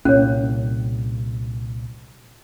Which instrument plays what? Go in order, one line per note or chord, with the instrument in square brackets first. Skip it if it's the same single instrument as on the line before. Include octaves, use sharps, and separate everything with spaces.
[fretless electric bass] C2 A#2 A#3 [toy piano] C#4 C#5